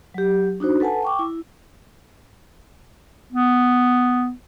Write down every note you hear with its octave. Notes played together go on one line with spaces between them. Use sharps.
F#3 G4
D4 D#4 F#4 C5
A4 B4 F#5 G#5 A5
G5 C#6 D6
E4
B3